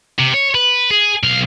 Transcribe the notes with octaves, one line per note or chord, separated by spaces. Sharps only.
C3
C#5
B4
G#4
B1 F5